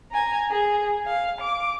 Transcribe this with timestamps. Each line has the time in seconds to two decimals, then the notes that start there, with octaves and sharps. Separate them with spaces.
0.12 G#5 A#5
0.51 G#4
1.06 F5
1.41 D6